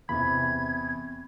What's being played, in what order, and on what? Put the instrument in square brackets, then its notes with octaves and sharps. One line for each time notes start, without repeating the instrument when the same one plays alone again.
[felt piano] E2 C3 [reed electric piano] B5 [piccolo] G#6